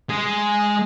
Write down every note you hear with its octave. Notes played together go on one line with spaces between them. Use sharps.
G#3 G#4